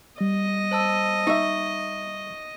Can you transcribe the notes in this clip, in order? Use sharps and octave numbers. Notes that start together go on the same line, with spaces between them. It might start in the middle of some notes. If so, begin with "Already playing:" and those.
G3 D#5
C5 A5 E6
D#4 E5 C#6